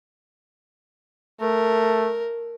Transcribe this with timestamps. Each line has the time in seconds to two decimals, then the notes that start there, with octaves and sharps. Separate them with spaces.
1.41 A3 A#4